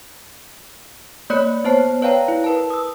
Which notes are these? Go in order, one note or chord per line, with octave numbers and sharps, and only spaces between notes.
A#3 C#5 D5 B5 F#6 C#7
B3 C5 C#5 A5 C7
B4 C#5 D5 F5 G5 A#5
E4
A#4 B4 A5
D#6 E6